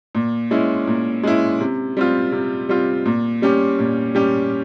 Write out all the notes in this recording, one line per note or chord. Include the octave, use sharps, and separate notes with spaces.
A#2
G#3 C#4 E4
A#2
G#3 C#4 E4
C3
G3 C4 F4
C3
G3 C4 F4
A#2
G3 C#4 G4
A#2
G3 C#4 G4